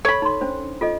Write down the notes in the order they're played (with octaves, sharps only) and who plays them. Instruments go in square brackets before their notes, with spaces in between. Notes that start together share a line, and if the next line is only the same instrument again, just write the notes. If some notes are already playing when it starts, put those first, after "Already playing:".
[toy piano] A4 [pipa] C#5 B5
[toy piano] D#4 C6
C#4 D4 C5
F4 A4 D#5